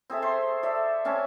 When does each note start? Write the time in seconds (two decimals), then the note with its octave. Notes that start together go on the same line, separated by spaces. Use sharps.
0.10 C4 G#4 A4 E5
0.22 C5 C6 C#6
0.63 A4 D5 E5
1.05 C4 C#4 G#5 A5